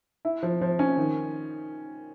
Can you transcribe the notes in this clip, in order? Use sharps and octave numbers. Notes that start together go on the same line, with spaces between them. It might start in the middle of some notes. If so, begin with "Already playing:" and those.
E4
F3
F3
C#4
D#3